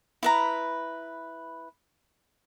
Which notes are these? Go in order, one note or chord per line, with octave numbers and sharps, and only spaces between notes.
E4 B4 A#5